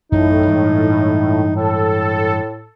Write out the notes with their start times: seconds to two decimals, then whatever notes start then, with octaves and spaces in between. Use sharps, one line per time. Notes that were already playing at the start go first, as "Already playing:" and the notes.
0.12 A1 F#2 A2 D#4
0.46 G2 E3 G#3
1.56 A2 A4